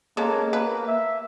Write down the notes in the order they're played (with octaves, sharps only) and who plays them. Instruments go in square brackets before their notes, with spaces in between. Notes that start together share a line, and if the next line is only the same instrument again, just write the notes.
[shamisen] G#3 C#4 A4 [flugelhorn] A#3
[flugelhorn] A#3 [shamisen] B4
[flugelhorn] E5